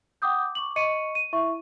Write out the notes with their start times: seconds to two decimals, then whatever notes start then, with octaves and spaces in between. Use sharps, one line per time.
0.22 F#5 G5 D6 D#6 G6
0.55 C#6 D6 F#7
0.76 D#5 C#6 C#7 D#7
1.15 D#7
1.33 E4 E5 C#6